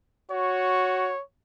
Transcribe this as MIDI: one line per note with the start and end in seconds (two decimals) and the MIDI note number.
0.31 1.13 66
0.31 1.22 73